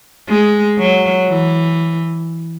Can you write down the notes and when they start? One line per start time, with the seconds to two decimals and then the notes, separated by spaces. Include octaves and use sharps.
0.29 G#3
0.78 F#3
1.28 E3